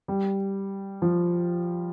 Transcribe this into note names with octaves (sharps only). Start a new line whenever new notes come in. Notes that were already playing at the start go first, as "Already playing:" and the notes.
G3
F3